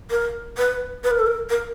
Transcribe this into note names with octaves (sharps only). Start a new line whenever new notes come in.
A#4
B4
B4
A#4
A4
A#4
A#4